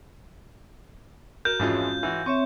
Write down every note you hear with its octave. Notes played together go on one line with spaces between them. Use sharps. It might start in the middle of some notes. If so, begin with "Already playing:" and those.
F#4 A#4 G6
F2 G#2 E3 G#3 C#4 F4
E3 F#4
C4 C#5 E5 C#6